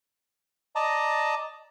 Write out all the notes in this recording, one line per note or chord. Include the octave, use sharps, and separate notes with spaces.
D5 D#5 A5 A#5